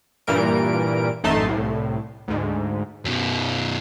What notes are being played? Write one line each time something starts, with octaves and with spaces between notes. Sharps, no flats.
G2 A#2 E3 G3 A#4 D7
A1 F#2 A3 D#4 A5 C6
C2 A2
D2 G#2
F#2 B2